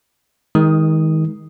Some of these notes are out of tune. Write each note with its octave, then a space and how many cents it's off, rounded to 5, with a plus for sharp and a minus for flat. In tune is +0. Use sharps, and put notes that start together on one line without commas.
D#3 +30 G#3 +0 D#6 +0